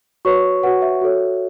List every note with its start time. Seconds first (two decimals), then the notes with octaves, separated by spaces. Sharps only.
0.25 F#4 B4 C#5 C#6
0.63 F#4 B4 F#5
0.82 E5
1.01 F#4 A4 C#5